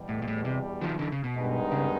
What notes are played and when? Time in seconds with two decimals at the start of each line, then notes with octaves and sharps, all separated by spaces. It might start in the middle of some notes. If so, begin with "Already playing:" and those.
Already playing: E2 B2 G3
0.09 A2
0.22 A#2
0.28 A2
0.45 C3
0.82 D#3 F3
0.99 D3 E3
1.12 C#3
1.24 B2
1.35 G2 D#3 G#3 B3 D#4
1.72 C#3